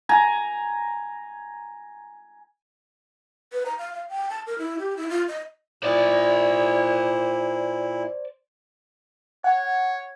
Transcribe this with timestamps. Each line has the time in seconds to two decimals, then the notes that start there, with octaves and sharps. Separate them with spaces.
0.09 G#5 A#5
3.52 B4
3.66 A#5
3.78 F5
3.93 F5
4.09 G5
4.30 A5
4.47 A#4
4.58 E4
4.79 G4
4.97 E4
5.10 F4
5.28 D#5
5.83 A#2 E4 C5 D5
9.44 C#5 F#5